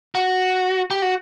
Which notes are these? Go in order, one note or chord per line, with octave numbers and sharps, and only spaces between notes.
F#4
G4
F#4